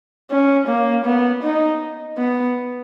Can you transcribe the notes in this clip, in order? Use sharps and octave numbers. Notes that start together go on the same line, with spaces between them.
C#4
A#3
B3
D#4
B3